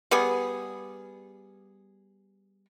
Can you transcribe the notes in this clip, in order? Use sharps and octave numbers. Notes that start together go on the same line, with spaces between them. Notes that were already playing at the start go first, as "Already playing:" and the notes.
G3 B3 G#4